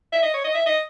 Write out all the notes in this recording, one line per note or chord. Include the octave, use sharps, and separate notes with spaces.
E5
D#5
C#5
D#5
E5
D#5